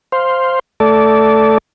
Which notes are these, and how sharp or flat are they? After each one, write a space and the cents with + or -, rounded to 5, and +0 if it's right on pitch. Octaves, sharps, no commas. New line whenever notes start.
C5 +0 F5 +0
A3 +0 A4 +0 D5 -20